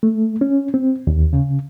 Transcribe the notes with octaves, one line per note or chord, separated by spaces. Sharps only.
A3
C#4
C4
D#2
C#3